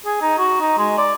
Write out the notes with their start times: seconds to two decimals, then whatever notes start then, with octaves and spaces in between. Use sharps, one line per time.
0.06 G#4
0.21 D#4
0.38 F#4
0.60 D#4
0.78 G#3
0.97 D5